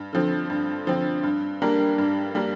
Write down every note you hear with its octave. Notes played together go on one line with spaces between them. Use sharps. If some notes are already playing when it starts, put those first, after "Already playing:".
Already playing: G2
D3 F3 C4
G2
D3 F3 C4
G2
G3 A#3 D4 A#4
G2
G3 A#3 D4 A#4